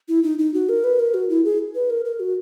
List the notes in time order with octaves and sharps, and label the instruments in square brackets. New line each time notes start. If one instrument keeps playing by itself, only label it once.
[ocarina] E4
D#4
D#4
F#4
A#4
B4
A#4
F#4
E4
G#4
B4
A#4
A#4
F#4